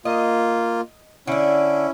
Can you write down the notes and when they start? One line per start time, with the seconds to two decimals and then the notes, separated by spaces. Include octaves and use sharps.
0.05 A#3 F4 D#5
1.27 D3 C#4 D4 E4